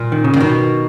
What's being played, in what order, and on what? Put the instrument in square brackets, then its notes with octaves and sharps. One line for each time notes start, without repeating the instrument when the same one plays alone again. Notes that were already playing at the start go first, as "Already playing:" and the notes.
Already playing: [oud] A#2
[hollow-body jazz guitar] D#3
C#3
[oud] A#2
[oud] B2 [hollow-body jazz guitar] D#3